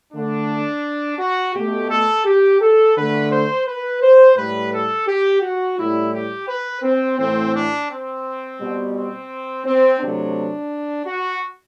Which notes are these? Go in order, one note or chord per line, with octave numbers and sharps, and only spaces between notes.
D3 A3 D4
F#4
B2 A3 G4
A4
G4
A4
D3 A3 B4
C5
B4
C5
A2 G3 B4
A4
G4
F#4
A2 G3 E4
G4
B4
C4
A2 E3 A3 C4
D4
C4
B2 G3
C4
C4
C3 F#3 A3 D4
F#4